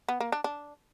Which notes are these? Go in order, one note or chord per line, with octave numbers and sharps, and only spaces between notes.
B3
A#3
D4
D4